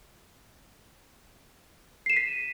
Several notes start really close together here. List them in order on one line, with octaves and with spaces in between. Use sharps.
C7 E7 D#7 B6